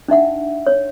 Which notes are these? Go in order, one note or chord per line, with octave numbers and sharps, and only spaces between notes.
D4 D#4 E5 F#5
C#5